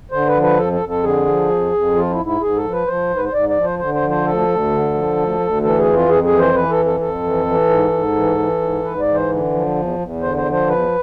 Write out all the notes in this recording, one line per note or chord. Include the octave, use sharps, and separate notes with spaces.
D3 C5
B4
F3
B4
F2 A4
A4
F2
A4
D3 G#4
F3
F2
F2
F3 F4
E4
G#2
E4
G#2 G#4
A4
F3
B4
F3 C5
G#2
B4
C5
G#2 D5
D5
F3
C5
D3 C5
C5
F3
C5
D2 A4
D2
D3
F3
D2
D2
E3 A4
G#4
F2
F4
F2 G#4
G#4
E3
C5
E3 B4
A4
F2
A4
F2 A4
E3
E3
G#2
G#2
E3
E3
G#2
G#2 B4
D5
E3
C5
D3
F3
E2
E2
D3 C5
C5
F3
C5
E2 B4